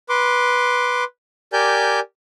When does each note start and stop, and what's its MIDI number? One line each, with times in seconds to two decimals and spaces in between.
0.09 1.04 71
0.09 1.04 84
0.09 1.04 86
1.53 2.00 67
1.53 2.00 70
1.53 2.00 74
1.53 2.00 80
1.53 2.00 91